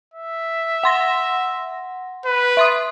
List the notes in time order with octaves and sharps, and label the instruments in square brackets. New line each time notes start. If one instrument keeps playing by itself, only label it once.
[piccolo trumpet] E5
[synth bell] F#5 C6 A#6
[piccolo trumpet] B4
[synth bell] E5 C6 D#6